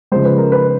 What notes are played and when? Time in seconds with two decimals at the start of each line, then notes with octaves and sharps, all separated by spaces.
0.12 C#3 F3 G#3 C5
0.25 B4
0.38 A#4
0.52 B4